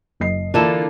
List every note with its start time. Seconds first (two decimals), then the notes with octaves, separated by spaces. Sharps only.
0.20 F#1 D#5 C7
0.54 D3 E3 A#3 D4 E4 F4 A4